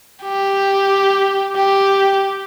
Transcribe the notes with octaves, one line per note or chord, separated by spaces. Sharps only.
G4
G4